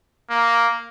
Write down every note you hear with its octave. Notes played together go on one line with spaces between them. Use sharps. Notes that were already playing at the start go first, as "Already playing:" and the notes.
A#3